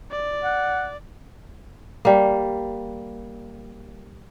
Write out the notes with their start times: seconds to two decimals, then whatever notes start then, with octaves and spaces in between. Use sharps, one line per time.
0.11 D5
0.44 F#5
2.05 G3 A#3